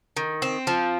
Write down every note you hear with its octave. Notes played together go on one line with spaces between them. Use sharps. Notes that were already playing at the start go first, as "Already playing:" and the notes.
D#3
C4
F3